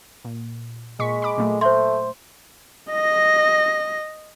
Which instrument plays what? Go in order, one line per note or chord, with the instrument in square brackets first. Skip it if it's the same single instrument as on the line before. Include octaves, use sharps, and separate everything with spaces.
[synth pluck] A#2
[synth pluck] A#2 C#6 B6 [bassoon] G#3
[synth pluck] B5 D6
A#2 F#3 A3
[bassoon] A3 [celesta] C5 E5 C6 [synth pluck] G6
[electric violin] D#5 A#6